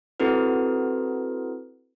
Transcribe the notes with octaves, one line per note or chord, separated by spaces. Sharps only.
C4 E4 F#4 A4 B4